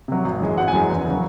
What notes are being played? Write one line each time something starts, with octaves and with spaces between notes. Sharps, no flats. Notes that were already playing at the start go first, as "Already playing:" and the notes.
C3 F#3
G#1
F#2 E3 G#3
G#1 F#5
G#5
F#2 E3 G#3
E2
C#3 F#3